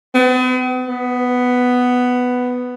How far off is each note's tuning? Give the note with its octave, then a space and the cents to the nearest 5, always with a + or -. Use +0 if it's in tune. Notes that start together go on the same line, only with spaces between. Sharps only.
B3 +45
B3 +5